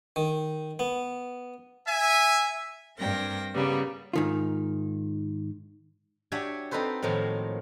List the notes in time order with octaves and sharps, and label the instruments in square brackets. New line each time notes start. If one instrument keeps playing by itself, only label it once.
[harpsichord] D#3
B3
[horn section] E5 G#5
[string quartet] G2 C4 A#4 G5 A#6
C#3 G3 A#3 B3
[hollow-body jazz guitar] G#2 D#3 F4
[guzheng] D4 F#4 G4 C#5 E5 G#5
C4 D#4 A4 B4 C5
A2 D#3 F3 F#3 A#3